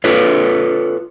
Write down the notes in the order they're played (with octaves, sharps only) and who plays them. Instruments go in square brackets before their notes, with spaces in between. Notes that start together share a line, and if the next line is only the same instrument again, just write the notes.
[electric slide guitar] F4 A4 B4 C#5